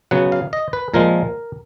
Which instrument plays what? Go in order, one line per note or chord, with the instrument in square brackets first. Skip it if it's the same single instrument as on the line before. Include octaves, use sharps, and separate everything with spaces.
[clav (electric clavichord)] C#3 F#3 B3 F#5
F5
D#5
B4
A#2 F3 G#3 A#4